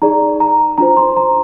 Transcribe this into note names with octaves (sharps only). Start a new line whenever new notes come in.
D#4 G#4 D5 A#5
A#5
D4 F4 C5 A#5
C6
A#5